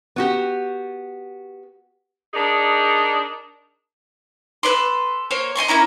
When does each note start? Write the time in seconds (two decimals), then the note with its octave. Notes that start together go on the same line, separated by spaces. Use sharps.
0.16 B3 F#4 G4
2.34 D4 D#4 G#4 A#4 D5
4.63 A4 B4 D5 C6
5.31 A#3 C5 C#5
5.56 D#5 G#5 C6 C#6
5.68 A#3 C#4 E4 A#5